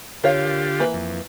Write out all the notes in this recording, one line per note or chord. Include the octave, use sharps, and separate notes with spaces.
D3 F4 G4 A#4 C#5 F5
E3 A#3 B4
F2